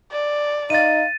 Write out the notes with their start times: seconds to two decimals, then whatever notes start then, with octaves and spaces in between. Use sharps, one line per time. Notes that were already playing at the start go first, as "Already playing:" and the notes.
0.12 D5
0.70 D#4 F5 A6 D#7